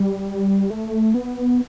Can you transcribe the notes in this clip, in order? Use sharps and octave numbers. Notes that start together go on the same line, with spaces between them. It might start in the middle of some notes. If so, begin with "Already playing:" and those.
Already playing: G3
A3
B3